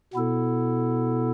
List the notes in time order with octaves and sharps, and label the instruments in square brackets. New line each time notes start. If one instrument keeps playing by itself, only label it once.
[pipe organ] B2 B3 E4 A4